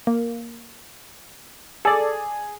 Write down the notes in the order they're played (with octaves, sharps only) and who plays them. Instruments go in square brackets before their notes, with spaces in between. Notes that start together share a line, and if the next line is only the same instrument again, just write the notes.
[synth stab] A#3
[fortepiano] G#4 [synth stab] A4 D5